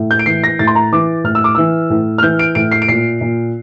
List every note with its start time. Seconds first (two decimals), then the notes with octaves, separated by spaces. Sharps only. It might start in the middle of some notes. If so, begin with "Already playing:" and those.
Already playing: A2
0.11 G6
0.19 D7
0.26 E3 C7
0.44 A#6
0.59 A2 A6
0.67 C6
0.75 A#5
0.93 E3 D6
1.24 A2 F6
1.35 E6
1.44 D6
1.55 E3 E6
1.90 A2
2.18 F6
2.23 E3 G6
2.39 D7
2.55 A2 D7
2.71 C7
2.82 D7
2.88 A#2 C7
3.21 A#2